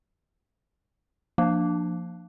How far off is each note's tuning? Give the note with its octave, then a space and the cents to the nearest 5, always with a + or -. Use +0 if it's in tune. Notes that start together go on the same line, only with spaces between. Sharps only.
F3 +0 A#3 +0 D4 +20